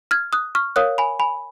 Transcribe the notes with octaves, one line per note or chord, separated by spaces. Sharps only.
F6 G#6
D#6 F#6
C#6 F6
A#4 C#5 F5 D#6 F#6
G#5 B5
G#5 B5